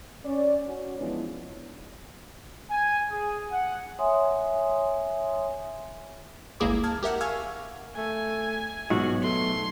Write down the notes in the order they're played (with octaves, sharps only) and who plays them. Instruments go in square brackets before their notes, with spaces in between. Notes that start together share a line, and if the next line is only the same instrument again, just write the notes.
[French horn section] C#4 D5
C#4 F#4
E3 F3 G#3 B3 D4 E4
[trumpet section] G#5
G#4
F#5
[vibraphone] C#5 E5 G#5 C6 D#6
[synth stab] G1 C#2 A#3 E4 G#4 D6
A5 F6 G#6
G4 A#4 E5 F#5
F5 G#5 C#6 E6 F6 G#6
[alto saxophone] A3 [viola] G#5
[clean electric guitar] B1 [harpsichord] G#2 [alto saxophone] F#4
[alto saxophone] A3 [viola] C6